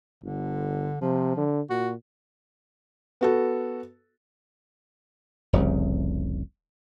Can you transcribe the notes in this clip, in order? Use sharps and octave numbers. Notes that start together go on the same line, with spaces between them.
G1 D3
C3 F3
D3
A#2 F#4
B3 F#4 A4
F1 C2 C#3